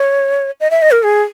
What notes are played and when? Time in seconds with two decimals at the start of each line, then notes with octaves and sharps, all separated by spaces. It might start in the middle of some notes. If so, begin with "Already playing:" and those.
Already playing: C#5
0.60 D#5
0.71 E5
0.82 D#5
0.91 A#4
1.03 G#4